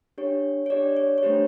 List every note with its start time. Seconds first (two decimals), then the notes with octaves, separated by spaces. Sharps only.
0.18 D4 G4 C#5
0.66 C#5
0.70 D4 G4 D5
0.97 C#5
1.18 C#5
1.23 A3 D4 G4 C5